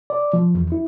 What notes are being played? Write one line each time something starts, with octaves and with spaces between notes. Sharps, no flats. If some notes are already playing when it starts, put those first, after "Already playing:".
D5
F3
E2
E4